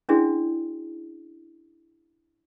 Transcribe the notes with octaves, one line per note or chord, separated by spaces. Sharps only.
C#4 D4 E4 F#4 G#4 D5